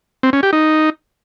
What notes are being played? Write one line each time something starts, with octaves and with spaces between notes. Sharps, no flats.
C4
C#4
G4
D#4